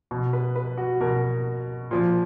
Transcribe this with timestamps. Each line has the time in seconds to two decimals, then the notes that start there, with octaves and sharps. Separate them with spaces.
0.11 B2
0.33 B4
0.56 B4
0.78 F#4
1.01 B2 A#4
1.91 A#2 F3